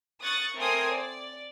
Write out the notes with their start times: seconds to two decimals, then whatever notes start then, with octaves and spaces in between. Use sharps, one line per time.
0.22 C#6 D#6 F#6 A6
0.56 A3 C4 A#4 G#5 C6 D#6
0.94 D5